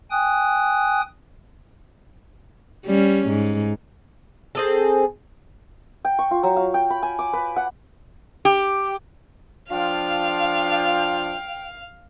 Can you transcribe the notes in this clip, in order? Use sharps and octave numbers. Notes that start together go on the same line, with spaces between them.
G5 G#5 D#6 F#6
G3 C#4
G#2
C4 G#4 A4
G5
C#6
F4
F#3
F5
G5
B5
G#5
D6
B4
F#5
G4
F3 D4 F4 F5 G5